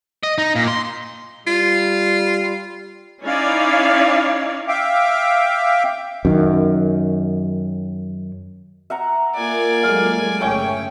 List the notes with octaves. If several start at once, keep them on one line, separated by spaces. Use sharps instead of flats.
D#5
D#4
A#2
C6
G3 F4
C#4 D#4 E4 C#5 D5 F5
E5 F5 G5 D6
F#2 D#3
E5 F#5 A#5
A#3 F4 A#4 D5 G#5
F#3 G#3 A3 F5 D6
G1 C#3 A3 C#4 C#5 E5 G5 G#5